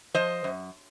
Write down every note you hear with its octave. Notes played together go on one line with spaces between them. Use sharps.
F3 C5 D#5
F#2